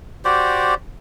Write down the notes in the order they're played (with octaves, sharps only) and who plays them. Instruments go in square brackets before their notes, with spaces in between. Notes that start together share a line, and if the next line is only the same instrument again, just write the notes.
[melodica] F#4 G4 C5 D5